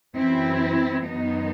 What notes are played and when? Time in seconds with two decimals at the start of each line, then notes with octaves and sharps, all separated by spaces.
0.15 F#2 E3 C4 E4
1.05 F#2 D#3 B3 D#4